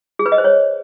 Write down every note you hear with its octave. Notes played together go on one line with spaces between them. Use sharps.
G#4
B4
D#5
C5
C#5